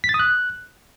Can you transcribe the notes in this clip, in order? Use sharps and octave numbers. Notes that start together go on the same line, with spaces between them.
B6
A6
D#6
F#6